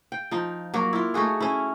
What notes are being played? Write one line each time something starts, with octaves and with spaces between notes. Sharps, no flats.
G5
F3 D#4
F#3 A#3 F#4
E4 F4
A3 D#4 F#4 G#4
C#4 E4